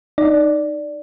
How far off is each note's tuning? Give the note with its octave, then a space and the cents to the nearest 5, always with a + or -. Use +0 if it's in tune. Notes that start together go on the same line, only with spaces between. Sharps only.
D#4 -15 D5 -5